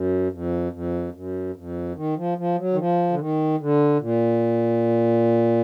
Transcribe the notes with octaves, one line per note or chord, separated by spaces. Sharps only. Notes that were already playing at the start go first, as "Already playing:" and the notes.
Already playing: F#2
F2
F2
F#2
F2
D#3
F3
F3
F#3
D#3
F3
D3
D#3
D3
A#2